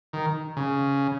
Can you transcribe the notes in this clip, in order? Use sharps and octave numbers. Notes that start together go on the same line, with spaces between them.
D#3
C#3